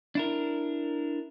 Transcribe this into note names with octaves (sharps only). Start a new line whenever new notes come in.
D4 E4 A#4